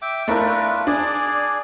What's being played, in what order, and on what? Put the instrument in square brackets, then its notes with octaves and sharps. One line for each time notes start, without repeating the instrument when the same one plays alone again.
[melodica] E5 G5 D6
[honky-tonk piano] A3 E4 A#4 [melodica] D4 F4 B4
[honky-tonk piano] D4 [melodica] G#4 D5 G#5